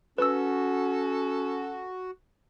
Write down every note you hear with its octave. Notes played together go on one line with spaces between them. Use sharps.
C#4 F#4 A4 B4 E6